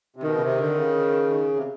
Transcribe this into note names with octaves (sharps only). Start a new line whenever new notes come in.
C3
B2 D#3
C#3
C3
D3
C#3
C3